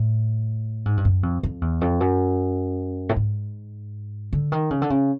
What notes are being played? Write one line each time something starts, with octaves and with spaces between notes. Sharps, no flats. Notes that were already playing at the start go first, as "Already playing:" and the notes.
Already playing: A2
G#2
G2
F#2
F2
F2
E2
F2
F#2
A2
G#2
D3
D#3
C#3
D3
C#3